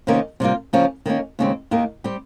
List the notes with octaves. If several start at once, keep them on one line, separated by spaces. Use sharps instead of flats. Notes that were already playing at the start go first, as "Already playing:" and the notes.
C3 D#3 A#3 C#4
C3 G3 A#3 F4
C#3 F3 A#3 C#4
D#3 G3 A#3 C#4
D#2 C#3 G#3 C4
D#2 D#3 A#3
G3 C4 G4